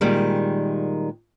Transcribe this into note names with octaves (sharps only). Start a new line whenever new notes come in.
A#2 D#3 G3 G#3